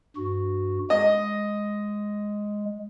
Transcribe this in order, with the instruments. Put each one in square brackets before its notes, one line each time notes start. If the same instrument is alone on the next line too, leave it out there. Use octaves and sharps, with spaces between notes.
[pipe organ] G2 F#4
[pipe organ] G#3 [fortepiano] D#5